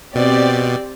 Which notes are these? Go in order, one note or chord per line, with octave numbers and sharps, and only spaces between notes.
B2 C4 G4 D5